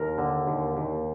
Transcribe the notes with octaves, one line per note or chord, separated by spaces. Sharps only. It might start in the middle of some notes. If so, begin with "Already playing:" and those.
Already playing: D#2 A#4
D3
D#2
D#2